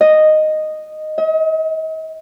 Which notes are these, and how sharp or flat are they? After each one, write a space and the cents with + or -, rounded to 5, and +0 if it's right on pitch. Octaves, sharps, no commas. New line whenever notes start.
D#5 -5
D#5 +40